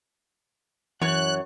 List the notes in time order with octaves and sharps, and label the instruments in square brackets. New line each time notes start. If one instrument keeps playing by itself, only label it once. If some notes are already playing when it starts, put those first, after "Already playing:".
[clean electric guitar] F#2 [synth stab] E3 G#6 [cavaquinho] C#5 C#6 [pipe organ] F#6